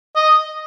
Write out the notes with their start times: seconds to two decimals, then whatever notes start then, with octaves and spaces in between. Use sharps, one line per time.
0.16 D#5